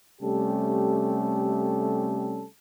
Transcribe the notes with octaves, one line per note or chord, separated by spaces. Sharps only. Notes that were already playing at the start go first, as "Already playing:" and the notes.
C3 G3 A3 C#4 G4 A4